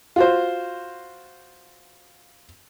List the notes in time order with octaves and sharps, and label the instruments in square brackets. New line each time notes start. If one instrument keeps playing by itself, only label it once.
[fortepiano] F4 F#4 C5